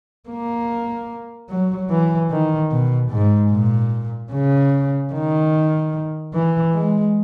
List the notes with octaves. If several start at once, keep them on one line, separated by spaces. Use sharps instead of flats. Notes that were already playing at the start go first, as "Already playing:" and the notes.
A#3
F#3
E3
D#3
B2
G#2
A#2
C#3
D#3
E3
G#3